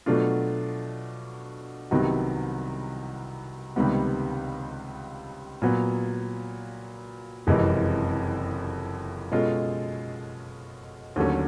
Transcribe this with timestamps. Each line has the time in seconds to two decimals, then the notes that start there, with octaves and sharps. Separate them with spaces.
0.06 B2 F#3 A3 D4 F4
1.91 C2 C3 D#3 F#3 B3
3.76 C#2 C3 D#3 G3 B3
5.62 A#2 F#3 B3
7.47 F#1 F2 C3 E3 G#3
9.31 B2 G#3 C#4 F4 A4
11.16 D#2 D3 F#3 A3 C#4